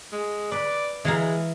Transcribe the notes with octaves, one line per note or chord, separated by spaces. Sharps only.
G#3
B4 D5
E3 G#3 F5 A#5